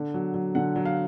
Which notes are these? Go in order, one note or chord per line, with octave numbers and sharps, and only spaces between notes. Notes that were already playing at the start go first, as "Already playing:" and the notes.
Already playing: D3
F#3
F#3
D3 F#5
F#3
F5